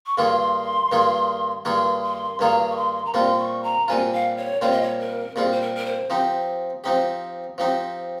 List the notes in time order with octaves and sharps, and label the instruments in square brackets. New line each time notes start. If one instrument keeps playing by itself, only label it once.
[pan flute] C#6
[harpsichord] G2 D#3 A#3 F4 G#4 [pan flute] C6
[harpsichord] G2 D#3 A#3 F4 G#4
[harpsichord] G2 D#3 A#3 F4 G#4 [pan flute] C6
[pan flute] C6
[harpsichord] G2 D#3 A#3 F4 G#4 [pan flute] A#5
[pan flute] C#6
C6
A#5
[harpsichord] A#2 G3 C4 F4 [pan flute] C6
[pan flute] C#6
A#5
[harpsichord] A#2 G3 C4 F4 [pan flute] G#5
[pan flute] F5
C#5
[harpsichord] A#2 G3 C4 F4 [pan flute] C#5
[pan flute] D#5
C#5
A#4
[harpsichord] A#2 G3 C4 F4 [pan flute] G#4
[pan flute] C5
A#4
A#4
C5
[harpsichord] F3 C4 D#4 G4
F3 C4 D#4 G4
F3 C4 D#4 G4